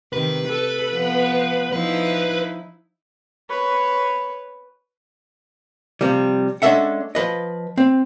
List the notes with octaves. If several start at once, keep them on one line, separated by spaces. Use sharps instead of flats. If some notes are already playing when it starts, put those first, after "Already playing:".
C3 D#3 B4
A4
F3 B3
F3 D#4 E4 B4
B4 C#5
C3 F3 G3
G#3 C#4 D4 A4 E5 F#5
F3 B4 D#5
C4